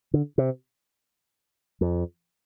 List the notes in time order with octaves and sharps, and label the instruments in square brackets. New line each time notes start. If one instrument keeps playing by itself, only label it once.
[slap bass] D3
C3
F2